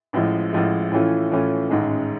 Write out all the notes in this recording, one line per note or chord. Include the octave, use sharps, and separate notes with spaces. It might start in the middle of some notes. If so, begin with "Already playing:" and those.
A1 A2 F3 G#3
A1 A2 F3 G#3
A2 E3 A3 C#4 F4
A2 E3 A3 C#4 F4
A1 G#2 D#3 G#3 C#4